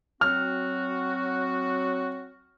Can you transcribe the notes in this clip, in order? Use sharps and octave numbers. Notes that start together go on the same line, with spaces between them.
F#3 C4 F#4 F6